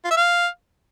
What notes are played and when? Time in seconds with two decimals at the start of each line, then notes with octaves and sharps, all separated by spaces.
0.05 F4
0.11 E5
0.17 F5